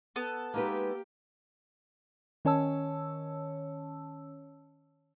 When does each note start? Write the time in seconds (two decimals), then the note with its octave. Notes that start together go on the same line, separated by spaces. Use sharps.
0.16 B3 A4
0.54 G#3 A#3 D#4 G4 B4
2.45 D#3 C#4 C#5 A5 E6